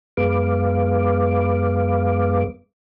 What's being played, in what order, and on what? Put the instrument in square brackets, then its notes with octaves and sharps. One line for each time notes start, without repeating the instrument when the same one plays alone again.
[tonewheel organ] F#2 G#3 B3 B4 F5 D6